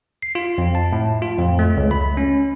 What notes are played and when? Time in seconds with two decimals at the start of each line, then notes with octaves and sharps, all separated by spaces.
0.23 C7
0.35 F4
0.58 F2
0.75 A5
0.93 A2
1.22 F4
1.39 F2
1.59 A3
1.77 C#2
1.91 B5
2.17 C#4